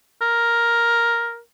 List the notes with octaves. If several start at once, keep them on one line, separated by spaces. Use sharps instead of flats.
A#4